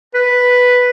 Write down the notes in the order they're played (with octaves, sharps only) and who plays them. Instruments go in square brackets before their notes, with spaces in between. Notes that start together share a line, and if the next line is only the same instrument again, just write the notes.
[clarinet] B4